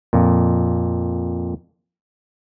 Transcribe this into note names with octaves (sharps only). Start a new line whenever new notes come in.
F2 A#2